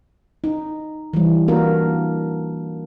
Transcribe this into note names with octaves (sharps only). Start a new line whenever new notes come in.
D#4
E3 G3
A#3 D4 F#4 A#4